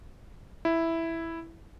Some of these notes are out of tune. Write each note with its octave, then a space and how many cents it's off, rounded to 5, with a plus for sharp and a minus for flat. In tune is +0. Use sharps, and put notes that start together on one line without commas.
E4 +0